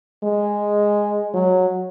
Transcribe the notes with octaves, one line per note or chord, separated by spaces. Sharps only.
G#3
F#3